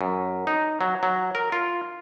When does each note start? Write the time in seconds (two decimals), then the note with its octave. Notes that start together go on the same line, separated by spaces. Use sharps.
0.01 F#2
0.47 D#4
0.81 F#3
1.03 F#3
1.35 A#4
1.52 F4